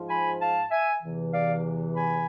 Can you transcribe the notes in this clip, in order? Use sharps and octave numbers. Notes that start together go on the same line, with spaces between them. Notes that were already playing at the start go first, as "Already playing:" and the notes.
Already playing: G#2 F3
G#5 B5
F5 A5
E5 G#5
E2 C3 E3
D5 F5
G#5 B5